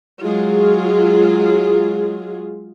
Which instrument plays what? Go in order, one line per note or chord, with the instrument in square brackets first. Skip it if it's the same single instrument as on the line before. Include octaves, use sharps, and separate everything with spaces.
[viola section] F#3 G#3 F4 G#4